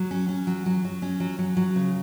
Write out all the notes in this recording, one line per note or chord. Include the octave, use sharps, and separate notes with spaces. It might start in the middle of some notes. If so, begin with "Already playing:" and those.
Already playing: F#3
C#4
C#4
F#3
F#3
F#3
C#4
F#3
F#3
F#3
C#3